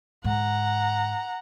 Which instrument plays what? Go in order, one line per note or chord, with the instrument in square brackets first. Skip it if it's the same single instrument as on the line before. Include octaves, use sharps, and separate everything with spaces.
[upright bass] G#2 D3 [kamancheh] F#5 A#5